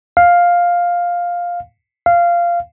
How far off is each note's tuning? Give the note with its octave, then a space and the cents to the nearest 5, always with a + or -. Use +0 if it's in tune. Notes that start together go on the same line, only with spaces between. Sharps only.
F5 +5
F5 -15